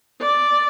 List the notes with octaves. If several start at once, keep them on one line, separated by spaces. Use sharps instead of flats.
D5